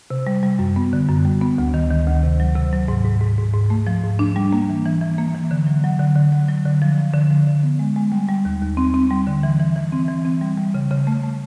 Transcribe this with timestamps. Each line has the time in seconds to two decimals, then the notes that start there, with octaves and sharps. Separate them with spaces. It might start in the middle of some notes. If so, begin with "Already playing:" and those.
0.10 C3
0.27 G3
0.43 G3
0.59 F#2
0.76 B3
0.93 D3
1.09 F#2
1.25 G3
1.41 B3
1.58 D2
1.74 D#3
1.91 D#3
2.07 D2
2.23 C3
2.40 F#3
2.56 C3
2.73 F#3
2.88 G#2
3.05 G#2
3.21 G#2
3.38 G#2
3.54 G#2
3.70 A3
3.87 F3
4.04 G#2
4.19 D4
4.36 G3
4.53 A#3
4.69 E3
4.85 E3
5.01 E3
5.18 A#3
5.35 E3
5.51 D3
5.67 F#3
5.84 F#3
5.99 D3
6.15 D3
6.32 F#3
6.48 F#3
6.65 D3
6.82 F3
6.98 F3
7.14 D3
7.30 F3
7.47 D3
7.63 B3
7.79 G#3
7.96 G#3
8.12 G3
8.29 G3
8.45 D#2
8.62 D#2
8.77 C4
8.94 C4
9.11 G3
9.27 D3
9.43 E3
9.60 E3
9.76 E3
9.92 C4
10.08 E3
10.25 C4
10.41 G3
10.58 G3
10.74 C#3
10.91 C#3
11.07 A3
11.23 A3